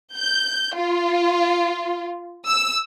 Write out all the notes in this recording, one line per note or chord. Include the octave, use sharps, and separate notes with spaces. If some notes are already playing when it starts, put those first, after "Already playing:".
G6
F4
E6